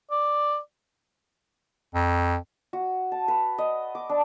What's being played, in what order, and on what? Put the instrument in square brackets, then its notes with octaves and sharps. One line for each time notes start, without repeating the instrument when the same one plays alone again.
[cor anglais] D5
[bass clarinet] F2
[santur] F#4
A5
B4
D#5
D6
D4